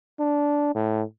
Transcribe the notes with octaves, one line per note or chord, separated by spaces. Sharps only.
D4
A2